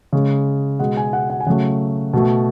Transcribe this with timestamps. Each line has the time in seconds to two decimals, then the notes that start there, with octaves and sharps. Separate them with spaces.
0.13 C#3 G#3
0.79 B2 G#3 F#5
0.97 G#5
1.13 F#5
1.30 F#5
1.40 G#5
1.46 C#3 F#3 A3 F#5
2.14 B2 A3